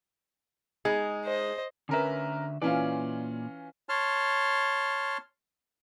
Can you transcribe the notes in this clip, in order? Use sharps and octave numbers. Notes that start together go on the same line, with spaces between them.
G#3 D#4 G#4
C5 D#5
D3 C#4 A#4 B4 E5
A#2 E3 C#4 F4 D5
C#5 A5 C6 F6